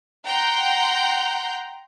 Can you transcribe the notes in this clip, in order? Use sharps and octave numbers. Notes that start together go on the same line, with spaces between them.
F#5 G5 A#5 C6 G6